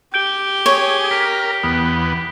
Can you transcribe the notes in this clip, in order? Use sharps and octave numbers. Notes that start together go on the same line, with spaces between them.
G4 G6 D7 G7
G#4 C#5
A#4 B6 D7
E2 B3 D#6